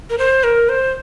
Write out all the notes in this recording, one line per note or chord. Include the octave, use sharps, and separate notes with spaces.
A#4
C5
A#4
C5